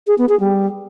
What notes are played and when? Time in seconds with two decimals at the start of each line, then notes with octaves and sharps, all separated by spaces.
0.07 G#4
0.18 B3
0.29 G#4
0.40 G3